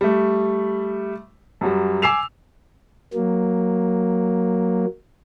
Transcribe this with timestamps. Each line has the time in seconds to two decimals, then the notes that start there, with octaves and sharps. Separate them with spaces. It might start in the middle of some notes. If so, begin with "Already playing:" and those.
0.01 G3 A3
1.61 F#2 F#3 G3
2.02 G#5 D6 E6 C7 E7 F7
3.14 F#3 A#3